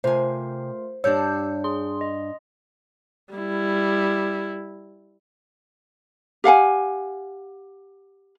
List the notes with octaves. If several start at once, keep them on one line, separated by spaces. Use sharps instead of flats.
C3 A3 F4 A#4 C5 G#5
G2 G3 D4 G4 C#5 E6 G6
G#4 C6
D#5
G3 E4
G4 F5 F#5 G#5